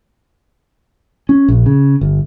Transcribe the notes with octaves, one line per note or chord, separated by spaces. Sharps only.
C#4
A#1
C#3
G1